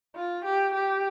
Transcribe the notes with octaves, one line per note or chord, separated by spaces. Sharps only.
F4
G4
G4